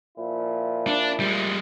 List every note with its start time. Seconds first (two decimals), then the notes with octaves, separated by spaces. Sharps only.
0.17 A#2 F3 E4
0.87 D4
1.20 G3 G#3